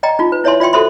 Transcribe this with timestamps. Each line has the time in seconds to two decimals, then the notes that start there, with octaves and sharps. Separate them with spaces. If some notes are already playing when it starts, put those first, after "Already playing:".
0.03 D5 D#5 G5 A#5
0.19 D#4 F4
0.32 B4
0.44 E4 C#5 D5 E5 G#5 C6
0.60 F4 D5 E5 G5 C6
0.73 F#4 A4 C5 E5 B5 C6